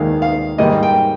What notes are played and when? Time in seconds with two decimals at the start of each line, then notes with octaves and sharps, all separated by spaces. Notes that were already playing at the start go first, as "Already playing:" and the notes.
Already playing: D#2 D#3 G#3 F5
0.22 F5
0.58 G#2 D#3 G3 A#3 D#5
0.83 G5